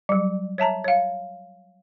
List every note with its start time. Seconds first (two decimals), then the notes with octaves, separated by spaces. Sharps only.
0.09 F#3 G3
0.58 C#5 E5 A5 A#5
0.84 C#5 F5